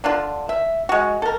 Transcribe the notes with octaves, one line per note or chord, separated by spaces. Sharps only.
D3 D4 F4
E5
G#3 F#4
A4 A#4